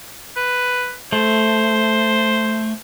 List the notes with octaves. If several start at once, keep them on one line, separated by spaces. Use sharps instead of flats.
B4
A3 C5